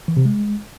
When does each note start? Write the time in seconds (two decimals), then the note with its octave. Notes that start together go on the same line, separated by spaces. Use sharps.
0.08 E3
0.17 C3
0.25 G#3